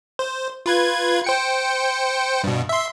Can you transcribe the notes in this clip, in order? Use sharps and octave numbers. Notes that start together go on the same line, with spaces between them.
C5
F4 B4 G#6
C5 G5 C#7
G2 B2
E5 C6